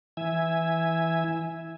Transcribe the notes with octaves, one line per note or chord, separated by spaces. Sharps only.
E3 E5 G#5